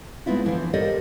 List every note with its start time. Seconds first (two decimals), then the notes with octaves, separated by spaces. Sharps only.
0.26 G#3 A3 B3 C4 E4 F4
0.45 D3 E3 F3 C5
0.73 G4 A4 A#4 C5 D5 D#5